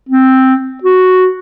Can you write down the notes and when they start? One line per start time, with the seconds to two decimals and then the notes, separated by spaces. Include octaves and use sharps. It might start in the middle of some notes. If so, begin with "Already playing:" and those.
0.09 C4
0.83 F#4